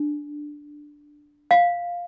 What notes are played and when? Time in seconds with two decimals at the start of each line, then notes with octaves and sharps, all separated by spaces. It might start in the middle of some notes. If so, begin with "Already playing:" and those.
Already playing: D4
1.51 F5